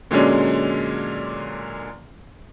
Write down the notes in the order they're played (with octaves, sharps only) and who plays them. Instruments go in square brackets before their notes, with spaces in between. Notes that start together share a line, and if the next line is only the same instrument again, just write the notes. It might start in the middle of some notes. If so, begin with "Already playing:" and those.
[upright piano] A#2 D3 F#3 G#3 C#4 D4